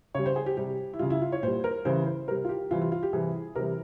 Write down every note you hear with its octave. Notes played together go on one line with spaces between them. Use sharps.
C#3 G3 C#5
C5
G#4
G4
C3 G3 G4
E4
C#3 G3 F4
E4
F4
C#5
A#2 G3 C5
A#4
C#3 E3 G3 C5
C5
C3 G3 A#4
F4
G4
C3 E3 G3 F4
F4
F4
G4
C3 E3 G3 G#4
C3 E3 G3 A#4